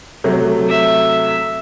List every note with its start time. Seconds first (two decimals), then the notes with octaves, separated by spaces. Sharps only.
0.24 C3 F#3 A3
0.69 E5